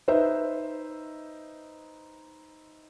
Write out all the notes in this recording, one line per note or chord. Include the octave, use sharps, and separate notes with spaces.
D#4 B4 C5 E5